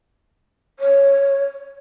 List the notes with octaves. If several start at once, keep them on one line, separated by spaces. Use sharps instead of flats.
C#5